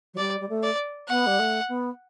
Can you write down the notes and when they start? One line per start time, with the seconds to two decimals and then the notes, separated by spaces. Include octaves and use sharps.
0.14 F#3
0.18 G3 D5
0.40 G3
0.49 A3
0.63 D5
1.08 B3 F#5
1.26 G3
1.39 A3
1.68 B3